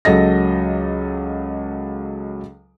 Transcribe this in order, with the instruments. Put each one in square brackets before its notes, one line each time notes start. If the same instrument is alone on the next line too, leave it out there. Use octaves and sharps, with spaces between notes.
[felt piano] C#2 F#3 A4 D#5 A#6